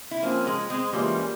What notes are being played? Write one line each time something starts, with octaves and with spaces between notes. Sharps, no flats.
E4
F3 A#3 C4 C#4 F4
G#3
G#3 C4
E3 G3 G#3 A#3 C#4 F4